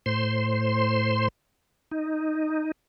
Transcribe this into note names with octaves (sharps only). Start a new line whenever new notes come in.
A2 C5 C6
D#4